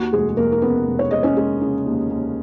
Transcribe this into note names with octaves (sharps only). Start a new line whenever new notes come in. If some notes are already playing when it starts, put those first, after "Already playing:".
Already playing: D#2 F#4
F1 G#3 G#4
G#4
F1 A#3 A#4
A#4
C#3 B3 B4
F1
C#5
G#3 D#5
C#4 C#5
G#3
C#3
D#2
D#2